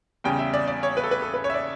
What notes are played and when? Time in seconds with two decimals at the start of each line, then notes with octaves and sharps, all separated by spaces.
0.24 E2 C#3 G3 C#4 G5
0.39 E5
0.54 D5
0.68 D5
0.83 C#5
0.97 B4
1.04 A4
1.11 B4
1.22 A4
1.34 B4
1.44 C#5
1.50 E5
1.54 D5